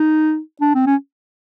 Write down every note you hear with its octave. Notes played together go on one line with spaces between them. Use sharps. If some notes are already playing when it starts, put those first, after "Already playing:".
Already playing: D#4
D4
C4
C#4